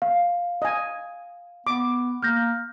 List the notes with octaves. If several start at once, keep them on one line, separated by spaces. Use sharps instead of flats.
F5
D#5 G#5
B3 D6
A#3 F6 G6 A#6